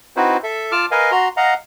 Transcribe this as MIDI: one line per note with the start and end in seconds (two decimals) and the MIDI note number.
0.16 0.37 60
0.16 0.37 63
0.16 0.37 64
0.16 0.37 66
0.16 0.37 71
0.16 0.37 72
0.43 0.72 69
0.43 0.72 76
0.72 0.86 65
0.72 0.86 81
0.72 0.86 86
0.72 0.86 89
0.91 1.11 70
0.91 1.11 71
0.91 1.11 75
0.91 1.11 77
0.91 1.11 80
1.11 1.28 66
1.11 1.28 82
1.11 1.28 84
1.37 1.54 75
1.37 1.54 77
1.37 1.54 78
1.37 1.54 82